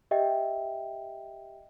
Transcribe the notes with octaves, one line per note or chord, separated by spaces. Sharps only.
G4 D#5 E5 G5